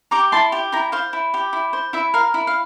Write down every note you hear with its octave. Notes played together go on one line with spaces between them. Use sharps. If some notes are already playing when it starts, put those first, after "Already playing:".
G4 A#5 D6
E4 A5 C6
G4
E4 G5 A#5
C5 F5
E4
G4
E4
C5
E4 E5
A#4 F5
E4
F5